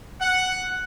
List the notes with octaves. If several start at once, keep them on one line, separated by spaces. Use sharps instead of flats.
F#5